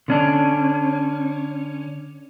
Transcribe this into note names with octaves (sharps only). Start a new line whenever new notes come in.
D3 C#4 D4